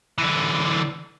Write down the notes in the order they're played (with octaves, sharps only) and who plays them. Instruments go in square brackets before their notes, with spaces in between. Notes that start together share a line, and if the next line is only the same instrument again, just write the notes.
[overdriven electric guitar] D3 E3